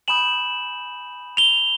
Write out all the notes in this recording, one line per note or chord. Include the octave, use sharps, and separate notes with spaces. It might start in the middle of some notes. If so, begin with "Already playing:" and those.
G#5 B5 D#6 G6 E7 F#7
F7 G7